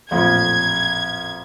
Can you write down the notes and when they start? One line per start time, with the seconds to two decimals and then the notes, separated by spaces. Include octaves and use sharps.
0.11 A1 F2 A#2 G#6